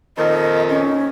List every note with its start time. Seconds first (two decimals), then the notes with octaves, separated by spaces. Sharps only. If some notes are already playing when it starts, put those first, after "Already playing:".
0.17 F2 A#2 D#3 D#5
0.69 C#4